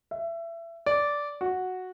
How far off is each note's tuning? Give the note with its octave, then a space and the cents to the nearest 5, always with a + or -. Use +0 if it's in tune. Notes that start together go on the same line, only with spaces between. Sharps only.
E5 +25
D5 -10
F#4 -5